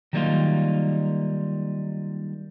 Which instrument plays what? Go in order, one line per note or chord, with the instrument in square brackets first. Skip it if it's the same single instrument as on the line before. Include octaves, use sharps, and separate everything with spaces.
[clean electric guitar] D#3 F#3 G3 A#3 D#4 F4